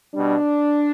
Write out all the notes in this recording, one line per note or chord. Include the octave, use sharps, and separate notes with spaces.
B2 G3 D4